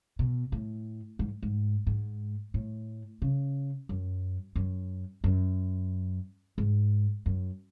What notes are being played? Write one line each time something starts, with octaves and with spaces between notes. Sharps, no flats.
B2
A2
G#2
G#2
G#2
A2
C#3
F#2
F#2
F#2
G#2
F#2